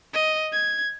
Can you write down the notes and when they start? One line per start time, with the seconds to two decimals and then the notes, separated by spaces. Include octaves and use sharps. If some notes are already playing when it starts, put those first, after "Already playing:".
0.14 D#5
0.52 G#6